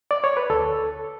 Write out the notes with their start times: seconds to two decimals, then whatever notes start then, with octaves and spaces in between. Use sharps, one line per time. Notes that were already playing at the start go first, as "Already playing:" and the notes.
0.11 D5
0.24 C#5
0.37 B4
0.50 D2 A4